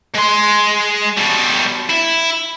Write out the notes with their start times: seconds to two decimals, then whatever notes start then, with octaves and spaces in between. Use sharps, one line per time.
0.14 G#3 C6
1.18 B2 G3
1.90 E4